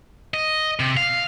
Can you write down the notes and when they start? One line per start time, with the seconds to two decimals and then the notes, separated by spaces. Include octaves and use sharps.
0.34 D#5
0.80 C3
0.97 F5